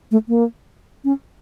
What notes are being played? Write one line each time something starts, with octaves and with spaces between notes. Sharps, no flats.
A3
A#3
C#4